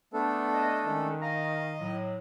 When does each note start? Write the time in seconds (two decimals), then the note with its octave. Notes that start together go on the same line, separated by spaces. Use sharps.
0.13 A3 B3 D4 A4
0.54 D#5
0.86 D#3 G#3 C#4
1.22 D#5 F5 A#5
1.81 A2 F#3